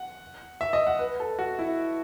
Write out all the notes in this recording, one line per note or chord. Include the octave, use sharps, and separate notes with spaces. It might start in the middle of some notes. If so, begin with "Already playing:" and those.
Already playing: F#5
E5
D#5
F#5
B4
A4
F#4
E4